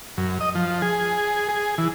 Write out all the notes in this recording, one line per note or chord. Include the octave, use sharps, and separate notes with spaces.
F#2
D#5
F3
G#4
G#4
E3